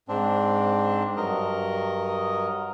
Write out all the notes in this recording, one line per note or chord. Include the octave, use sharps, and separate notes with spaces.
G#2 C4 D4
G2 F#3 A#4 D#5